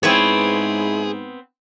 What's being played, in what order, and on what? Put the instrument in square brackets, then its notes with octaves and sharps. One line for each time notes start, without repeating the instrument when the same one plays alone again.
[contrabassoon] G#2 [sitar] B3 C4 [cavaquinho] E4 B4 C#5 [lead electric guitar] G#4